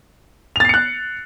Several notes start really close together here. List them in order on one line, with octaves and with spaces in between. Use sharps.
F7 A6 C7 C#7 F#6